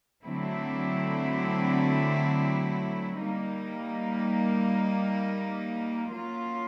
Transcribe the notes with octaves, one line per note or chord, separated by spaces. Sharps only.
D3 F#3 A3 C4 E4
G3 A#3 D#4
F#3 A#3 C#4 F4